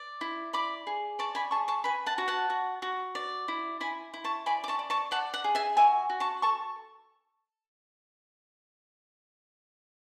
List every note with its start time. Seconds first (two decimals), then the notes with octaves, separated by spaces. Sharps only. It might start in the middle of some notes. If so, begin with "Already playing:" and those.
Already playing: D5
0.21 E4
0.53 D5 B5 D6
0.87 G#4
1.19 D5 A5 C#6
1.35 G#5 B5
1.51 G#4 A5 C#6
1.68 A5 C#6
1.84 B4 G#5 B5
2.06 F#5 A5
2.18 F#4
2.28 F#5 A5
2.50 F#4
2.82 F#4
3.15 D5
3.48 E4
3.80 E4 G#5 B5
4.14 E4
4.24 A5 C#6
4.46 D5 G#5 B5
4.64 D6
4.68 A5 C#6
4.79 D5
4.90 A5 C#6
5.11 D5 F#5 A5
5.34 F#5
5.44 G#4
5.55 E5 G#5
5.77 F#4 E5 G#5
6.10 F#4
6.20 A5 C#6
6.42 A4 A5 C#6